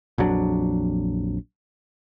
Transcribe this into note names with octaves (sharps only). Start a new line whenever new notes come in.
A#1 F2 F#3 D4